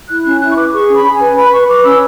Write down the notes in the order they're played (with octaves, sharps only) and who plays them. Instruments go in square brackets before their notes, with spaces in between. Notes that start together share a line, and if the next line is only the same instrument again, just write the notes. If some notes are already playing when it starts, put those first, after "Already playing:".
[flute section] E4 F#6
C#4 F#6
E4 F#6
C#6
B4 D6
D6
G#4 C#6
C#4
B5
C#4
G#5
B4
B4 B5
B4 C#6
B4 D6
C#4 E6